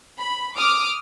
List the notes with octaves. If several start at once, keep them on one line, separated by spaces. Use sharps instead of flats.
B5
D6 D#6 F6